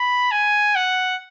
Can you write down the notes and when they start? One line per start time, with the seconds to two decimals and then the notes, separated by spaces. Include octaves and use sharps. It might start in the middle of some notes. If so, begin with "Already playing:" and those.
Already playing: B5
0.32 G#5
0.76 F#5